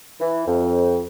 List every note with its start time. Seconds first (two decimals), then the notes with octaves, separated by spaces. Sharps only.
0.21 E3
0.47 F2